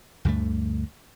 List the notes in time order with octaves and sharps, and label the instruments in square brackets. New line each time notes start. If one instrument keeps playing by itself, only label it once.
[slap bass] D2 G2 D3 A3